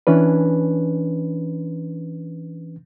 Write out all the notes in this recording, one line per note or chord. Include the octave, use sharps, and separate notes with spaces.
E3 C#4 D4 B4